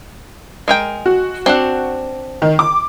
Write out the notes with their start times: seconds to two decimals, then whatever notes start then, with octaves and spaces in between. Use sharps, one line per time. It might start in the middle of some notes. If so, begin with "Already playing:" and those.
0.68 G#3 A#4 G5
1.06 F#4
1.46 C4 D4 F#5
2.42 D#3
2.59 D6